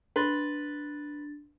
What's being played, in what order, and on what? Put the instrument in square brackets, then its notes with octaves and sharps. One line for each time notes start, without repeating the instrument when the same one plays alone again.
[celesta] D4 A6 [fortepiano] B4 C6